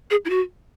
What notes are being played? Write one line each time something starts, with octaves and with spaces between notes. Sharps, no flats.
G#4
E4
F#4